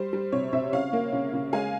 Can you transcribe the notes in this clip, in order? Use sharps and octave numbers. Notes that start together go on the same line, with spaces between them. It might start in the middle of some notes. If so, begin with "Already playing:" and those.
Already playing: G3 C5
G3
C3 C#5
C3 C5 E5
C#3 C#5 F5
A#3
C#3
C#3
G#3 F5 G#5